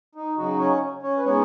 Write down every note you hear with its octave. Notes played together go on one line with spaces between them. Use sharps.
D#4
C#3 F#3 D#4 F#4
C#4 C#5
C#4 C#5
B4
G#3 B3 C#4 D#4 C#5